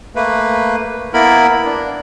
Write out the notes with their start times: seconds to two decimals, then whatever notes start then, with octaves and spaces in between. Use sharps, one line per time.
0.16 A3 A#3 B4
1.14 A#3 B3 E4 A#4 B5
1.65 D4